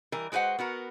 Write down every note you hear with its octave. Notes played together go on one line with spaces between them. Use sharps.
E3 G3 A#4
G#3 F#4 B4 C5 F#5
B3 F#4 A#4